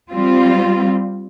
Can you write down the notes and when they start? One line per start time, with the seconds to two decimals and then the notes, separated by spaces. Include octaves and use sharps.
0.11 G3 C4 F4